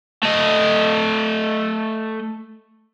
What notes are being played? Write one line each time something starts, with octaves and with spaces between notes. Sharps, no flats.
A3 D#5